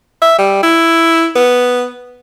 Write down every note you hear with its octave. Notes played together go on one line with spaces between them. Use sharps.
E5
G3
E4
B3